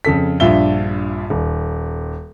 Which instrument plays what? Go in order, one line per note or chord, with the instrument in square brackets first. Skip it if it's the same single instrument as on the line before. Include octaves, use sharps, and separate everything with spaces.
[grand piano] F2 C#3 A4 B6
A#1 G2 F4 E5 G7
D#1